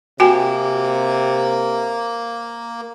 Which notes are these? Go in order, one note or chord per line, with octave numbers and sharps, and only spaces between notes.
C3 A#3 F#4 G5 G#5